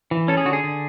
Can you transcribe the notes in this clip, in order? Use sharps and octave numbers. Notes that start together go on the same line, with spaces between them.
E3
C#4 A4
G#4
D3 F#4
G#4
D3